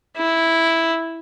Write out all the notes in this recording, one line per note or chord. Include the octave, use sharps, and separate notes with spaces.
E4